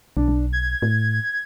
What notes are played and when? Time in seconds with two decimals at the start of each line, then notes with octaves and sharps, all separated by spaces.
0.17 B1 D4
0.28 B1
0.53 G#6
0.82 A2